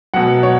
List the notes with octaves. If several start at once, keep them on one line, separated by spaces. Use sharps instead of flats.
B2 F#3 F#5
C#5